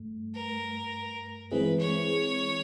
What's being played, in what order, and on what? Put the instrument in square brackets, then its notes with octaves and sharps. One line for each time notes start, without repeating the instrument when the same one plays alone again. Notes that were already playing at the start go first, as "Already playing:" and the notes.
Already playing: [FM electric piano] G2 A3
[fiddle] A#4
[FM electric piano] E3 G#3 C4 E4 G#4 [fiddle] B4
[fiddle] C#5